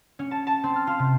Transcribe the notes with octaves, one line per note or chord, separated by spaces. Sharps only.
C#4
A5
A5
C4
F6
F4
C3